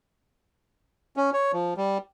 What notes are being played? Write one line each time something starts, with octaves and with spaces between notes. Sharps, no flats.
C#4
C#5
F3
G3